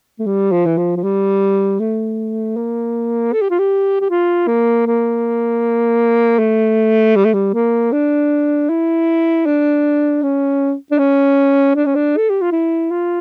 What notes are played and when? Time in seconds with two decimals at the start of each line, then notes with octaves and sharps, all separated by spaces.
0.19 A3
0.26 G3
0.52 F3
0.66 E3
0.78 F3
0.96 F3
1.03 G3
1.80 A3
2.56 A#3
3.33 A4
3.41 G4
3.50 F4
3.59 G4
4.00 G4
4.10 F4
4.47 A#3
4.87 A#3
6.39 A3
7.16 G3
7.25 A3
7.34 G3
7.54 A#3
7.92 D4
8.69 E4
9.46 D4
10.22 C#4
10.91 D4
10.98 C#4
11.75 D4
11.86 C#4
11.95 D4
12.17 A4
12.30 G4
12.41 F4
12.52 E4
12.91 F4